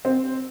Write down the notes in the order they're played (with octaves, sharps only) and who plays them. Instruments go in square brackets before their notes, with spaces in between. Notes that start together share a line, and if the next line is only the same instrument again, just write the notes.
[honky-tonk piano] C4